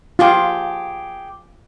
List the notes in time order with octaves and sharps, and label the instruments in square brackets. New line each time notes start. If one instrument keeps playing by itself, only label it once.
[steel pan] F4 [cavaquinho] G4 G#4 A5